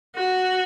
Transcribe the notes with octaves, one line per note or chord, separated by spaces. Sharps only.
F#4